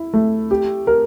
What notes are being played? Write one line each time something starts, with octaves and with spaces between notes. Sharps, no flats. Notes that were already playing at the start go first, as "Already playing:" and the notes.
Already playing: E4
A3
G4
A#4